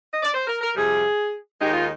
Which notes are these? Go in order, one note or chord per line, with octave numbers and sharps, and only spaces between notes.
D#5
D5
C5
A#4
A#4
F2 C3 G3 G#4
D#2 D#3 G#3 D#4 G4
F4